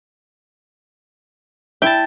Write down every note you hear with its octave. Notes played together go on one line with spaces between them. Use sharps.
E4 E5 G5 A5